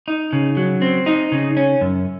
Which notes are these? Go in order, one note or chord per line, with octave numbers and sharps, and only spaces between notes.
D#4
C#3
F#3
C4
D#4
C#3
C#4
F#2